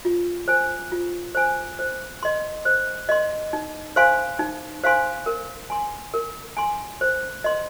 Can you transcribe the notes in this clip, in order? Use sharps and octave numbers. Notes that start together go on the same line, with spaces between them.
F4
C5 G#5
F4
C5 G#5
C5
D#5 C6
C5
D#5 C6
D#4
C5 F5 G#5 C6
D#4
C5 F5 G#5 C6
A#4
G#5 C6
A#4
G#5 C6
C5
D#5 C6